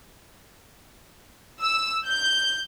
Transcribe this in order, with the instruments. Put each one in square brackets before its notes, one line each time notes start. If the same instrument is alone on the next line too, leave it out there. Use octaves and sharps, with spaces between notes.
[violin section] E6
G6